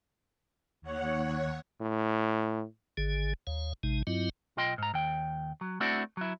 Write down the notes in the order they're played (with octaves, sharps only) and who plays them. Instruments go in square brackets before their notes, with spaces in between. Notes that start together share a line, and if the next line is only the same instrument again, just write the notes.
[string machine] D#2 C#5 F#5
[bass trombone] A2
[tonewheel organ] G#1 D3 G#4
D#2 C#5 F5
A1 C3 G#3 D#4
G2 F#3 C4 E4 F4 D#5
[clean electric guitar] B1 F4 D#5 G5 C6
G#2 A#5
D#2 G5
F#3
A3 C4 D4 E4 F#4 D5
F#3 E4